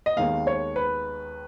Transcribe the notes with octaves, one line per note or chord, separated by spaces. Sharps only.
D#5
D#2 D#3 G#3 B3 F5
C#5
B4